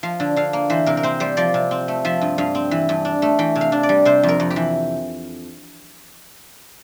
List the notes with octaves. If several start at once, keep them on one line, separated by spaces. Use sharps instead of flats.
F3 F5
D3
D3 F5
A#3
E3 C5
C3 A#4
A#4
C4 C5
G3 C5
F3 D5
C3
C4
A3
F3 E5
G2
G2 F5
C4
E3
G2
D4
A3
E3 G5
C3
F5
D4
D5
G3
C3 C5
F2
A#4
F2
G4
E3